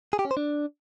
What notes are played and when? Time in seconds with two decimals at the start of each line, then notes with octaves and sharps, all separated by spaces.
0.13 G#4
0.19 G4
0.25 C#4
0.31 C5
0.37 D4